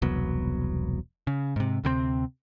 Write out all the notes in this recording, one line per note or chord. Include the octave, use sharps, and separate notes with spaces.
E1 C2 F#3 B3
C#3
G#2 C3
D2 C3 F#3 C4